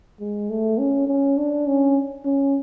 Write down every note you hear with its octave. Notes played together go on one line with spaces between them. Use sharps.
G#3
A3
C#4
C#4
D4
C#4
C#4